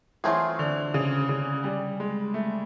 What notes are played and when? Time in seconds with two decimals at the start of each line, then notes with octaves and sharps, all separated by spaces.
0.24 E3 F#3 A3 C4 F4 G#4
0.59 D3
0.94 C#3
1.29 C#3
1.64 G3
2.00 G#3
2.34 A3